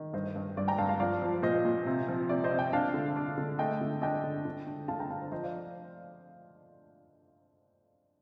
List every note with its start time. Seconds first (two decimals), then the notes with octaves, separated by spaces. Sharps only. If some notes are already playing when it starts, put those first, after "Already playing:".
Already playing: D#3
0.13 G2 C5 D#5
0.36 G2
0.57 G2 D5
0.68 G5 A#5
0.78 G2 F5 A5
0.89 F5 A5
0.99 F3 D5 F5
1.22 F3
1.43 A#2 C5 D#5
1.65 A#2
1.86 C3
2.08 F3
2.29 C3 D5
2.44 C5 D#5
2.51 C3
2.59 D#5 G5
2.73 D4 F5 A5
2.94 D3
3.16 D4
3.38 D3
3.59 A3 D#5 G5
3.81 D3
4.02 D4 D#5 G5
4.24 D3
4.45 D3
4.67 D4
4.88 D3 F5 A5
5.00 G5 A#5
5.10 D4 F5 A5
5.22 C5
5.32 F3 C5 D#5
5.43 D5 F5